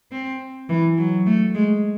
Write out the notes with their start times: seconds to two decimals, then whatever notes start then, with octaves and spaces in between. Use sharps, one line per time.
0.11 C4
0.69 E3
0.97 F#3
1.26 A3
1.54 G#3